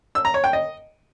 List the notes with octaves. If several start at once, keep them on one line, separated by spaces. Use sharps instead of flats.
E6
A#5
C#5
G5
D#5